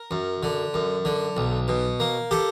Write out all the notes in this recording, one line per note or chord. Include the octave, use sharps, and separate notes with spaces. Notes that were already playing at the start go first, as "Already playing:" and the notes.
Already playing: A#4
F#2
D3
F#2
D3
B1
B2
A#3
G4 A4